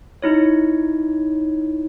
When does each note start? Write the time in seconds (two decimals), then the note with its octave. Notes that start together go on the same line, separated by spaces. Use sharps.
0.22 D#4 E4 C#5